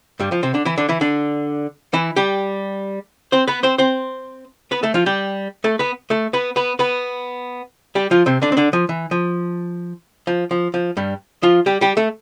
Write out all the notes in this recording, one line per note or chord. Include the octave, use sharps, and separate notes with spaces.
G2 G3
F3
C3 C4
D3 D4
E3 E4
D3 D4
E3 E4
D3 D4
E3 E4
G3 G4
C4 C5
B3 B4
C4 C5
C4 C5
B3 B4
A3 A4
F3 F4
G3 G4
A3 A4
B3 B4
A3 A4
B3 B4
B3 B4
B3 B4
G3 G4
F3 F4
C3 C4
D3 D4
C4
D3 D4
F3
E3
F3
F3
F3
F3
G2 G3
F3 F4
G3 G4
G3 G4
A3 A4